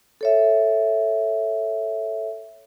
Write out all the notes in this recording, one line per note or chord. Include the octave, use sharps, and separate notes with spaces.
A4 C#5 E5